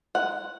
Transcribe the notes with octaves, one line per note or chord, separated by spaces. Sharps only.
F#5